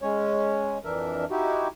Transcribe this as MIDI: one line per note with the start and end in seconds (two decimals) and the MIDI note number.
0.02 0.78 56
0.02 0.78 61
0.02 0.78 73
0.84 1.25 41
0.84 1.25 52
0.84 1.25 62
0.84 1.25 70
0.84 1.25 76
1.30 1.68 63
1.30 1.68 64
1.30 1.68 66
1.30 1.68 67